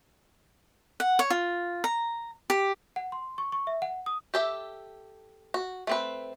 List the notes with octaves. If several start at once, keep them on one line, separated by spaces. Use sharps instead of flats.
F#5
C#5
F4
A#5
G4
F#5
C6
C#6
C#6
E5
F#5
D#6
G4 A4 E5
F#4
A3 C4 B4